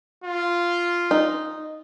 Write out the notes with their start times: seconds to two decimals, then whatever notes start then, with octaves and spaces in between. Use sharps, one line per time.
0.24 F4
1.11 D#4